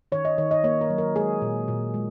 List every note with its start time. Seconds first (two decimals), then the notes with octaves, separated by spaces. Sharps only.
0.12 D#3 C#5
0.25 D#5
0.38 D#3 C#5
0.51 D#5
0.64 A#3 C#5
0.81 A#4
0.90 F#3
0.98 A#4
1.16 G#3 G#4
1.42 A#2
1.68 A#2
1.94 G#3